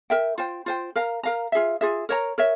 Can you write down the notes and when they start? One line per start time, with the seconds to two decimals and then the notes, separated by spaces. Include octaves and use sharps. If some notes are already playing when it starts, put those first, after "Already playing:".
0.10 A#4 E5 G5
0.38 F4 C5 G5
0.66 F4 C5 G5
0.95 A#4 F5 A#5
1.23 A#4 F5 A#5
1.52 F4 G#4 E5
1.81 F4 G#4 E5
2.09 A#4 C#5 E5 A#5
2.38 A#4 C#5 E5